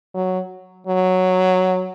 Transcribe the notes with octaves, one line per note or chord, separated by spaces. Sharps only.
F#3
F#3